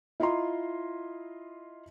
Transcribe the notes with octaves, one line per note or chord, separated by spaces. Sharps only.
E4 F4 D#5 A#5 C6